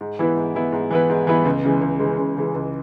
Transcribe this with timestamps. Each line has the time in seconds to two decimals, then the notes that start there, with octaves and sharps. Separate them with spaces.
0.01 G#2
0.19 E3 B3 E4 B4
0.36 G#2
0.55 E3 B3 E4 B4
0.72 G#2
0.91 E3 B3 E4 B4
1.10 G#2
1.27 E3 B3 E4 B4
1.45 C#2
1.63 C#3 E3 G#3
1.81 C#2
2.00 C#3 E3 G#3
2.18 C#2
2.37 C#3 E3 G#3
2.54 C#2